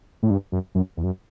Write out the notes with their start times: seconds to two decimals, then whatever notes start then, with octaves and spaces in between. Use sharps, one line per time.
0.23 A2
0.30 G2
0.52 F#2
0.75 F#2
0.97 E2
1.04 F#2